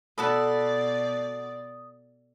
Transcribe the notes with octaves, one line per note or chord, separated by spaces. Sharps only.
B2 F#4 A4 D5 A5 B5 D#6